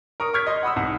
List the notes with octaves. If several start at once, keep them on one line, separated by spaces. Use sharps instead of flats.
A#4 C#6 D#6
C#6 F6 G#6 B6
D#5 C6
F#5 B5 D#6 E6
C2 D#4 F#5